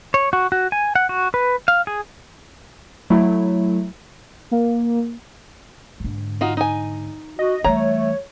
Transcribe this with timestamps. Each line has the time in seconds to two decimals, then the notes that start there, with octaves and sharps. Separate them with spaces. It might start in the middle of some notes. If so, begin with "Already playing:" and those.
0.14 C#5
0.33 F#4
0.52 F#4
0.72 G#5
0.95 F#5
1.09 F#4
1.34 B4
1.68 F5
1.87 G#4
3.10 F#3 A3 E4
4.51 A#3
6.00 G#2 D3
6.41 D#4 F4 F#4
6.57 D#4 G#5
7.39 F#4 D#5
7.64 E3 G3 A3 C#5 A#5